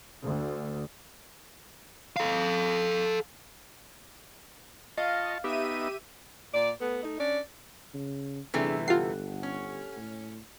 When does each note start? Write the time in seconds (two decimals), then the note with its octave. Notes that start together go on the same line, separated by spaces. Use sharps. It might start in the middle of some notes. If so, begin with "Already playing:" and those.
0.23 D2
2.17 A4 F5
4.97 F4 D#5 F5 A5 C#6
5.44 B3 D#4 G4 E5 D#7
6.53 A#2 D5
6.80 A3 B3
7.03 A3 D#4
7.19 C#4 D4 D5
7.94 C#3
8.54 G1 C3 E3 A3 D4 G#4
8.88 F4 G4 A4 F#5 C7
9.43 C#4
9.96 A2